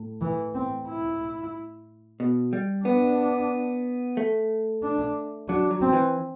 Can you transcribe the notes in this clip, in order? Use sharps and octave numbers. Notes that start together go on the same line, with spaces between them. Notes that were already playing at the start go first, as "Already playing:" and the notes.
Already playing: A2
E3
C4
E4
B2
G3
B3 D4
A3
D4
F#3 D4
F#3
C4
E3